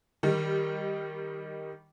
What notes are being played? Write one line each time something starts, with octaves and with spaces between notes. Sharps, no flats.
D#3 G3